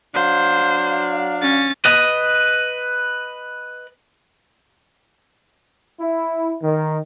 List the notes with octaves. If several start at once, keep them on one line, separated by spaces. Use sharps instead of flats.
F#3 D4 C5 F5
C#4 A6
B4 D#5
E4
D#3